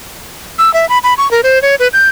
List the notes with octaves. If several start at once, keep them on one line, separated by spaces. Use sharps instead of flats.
E6
E5
B5
B5
C#6
A#4
C5
C#5
B4
G6